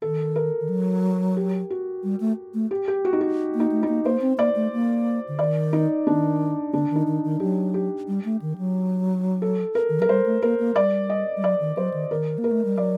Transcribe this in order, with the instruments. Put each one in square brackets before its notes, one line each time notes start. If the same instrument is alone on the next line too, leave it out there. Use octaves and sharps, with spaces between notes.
[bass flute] D#3 [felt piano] A4
[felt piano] A#4
[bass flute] D#3
F#3
[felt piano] G4
F#4
[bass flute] G3
A3
A3
[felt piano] G4
G4
F#4
D#4
F#4
[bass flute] A#3
[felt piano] D#4
[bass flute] A3
[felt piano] D#4
[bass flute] A#3
[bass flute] A#3 [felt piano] C5
[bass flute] C4
[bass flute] A#3 [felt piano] D5
[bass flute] A3
A#3
D3
[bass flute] D#3 [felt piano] D5
[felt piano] D#4
[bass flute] D#3 [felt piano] D4
[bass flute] D3 [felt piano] D4
[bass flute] D#3
[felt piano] D#4
[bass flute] D#3
D#3
[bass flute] F#3 [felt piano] G4
[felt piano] G4
[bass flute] G3
A3
D#3
F#3
[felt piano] A4
A#4
[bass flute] D#3
[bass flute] F#3 [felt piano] A#4
[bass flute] G3 [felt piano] C5
[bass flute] A3
[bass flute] A#3 [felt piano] A#4
[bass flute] A#3
[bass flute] G3 [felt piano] D5
[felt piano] D#5
[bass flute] G3
[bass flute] F#3 [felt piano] D5
[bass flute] D#3
[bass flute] F#3 [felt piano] C5
[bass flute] D#3
[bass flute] D#3 [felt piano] A#4
[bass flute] A#3
[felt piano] A#4
[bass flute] A3
G3
[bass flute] F#3 [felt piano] D5